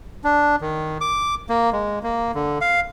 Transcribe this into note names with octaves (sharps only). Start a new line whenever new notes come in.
D4
D#3
D6
A#3
G#3
A#3
D3
F5